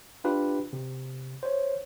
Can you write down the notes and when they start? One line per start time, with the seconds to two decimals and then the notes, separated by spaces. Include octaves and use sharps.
0.24 D4 F4 G4 B4
0.73 C3
1.43 C5 C#5